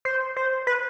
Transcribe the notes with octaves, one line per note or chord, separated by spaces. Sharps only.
C5
C5
B4